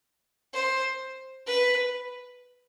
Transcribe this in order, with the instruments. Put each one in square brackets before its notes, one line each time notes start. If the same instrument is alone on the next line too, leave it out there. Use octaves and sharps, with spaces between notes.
[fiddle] C5
B4